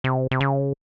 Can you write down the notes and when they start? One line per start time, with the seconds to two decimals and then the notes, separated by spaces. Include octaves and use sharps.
0.04 C3
0.31 C3
0.40 C#3